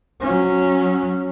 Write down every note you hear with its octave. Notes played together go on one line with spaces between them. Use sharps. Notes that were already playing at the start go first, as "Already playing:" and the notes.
F#3 C#4